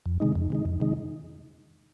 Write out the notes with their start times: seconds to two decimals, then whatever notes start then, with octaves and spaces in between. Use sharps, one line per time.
0.06 F2
0.20 C3 D#3 G#3 D#4
0.35 F2
0.50 C3 D#3 G#3 D#4
0.65 F2
0.80 C3 D#3 G#3 D#4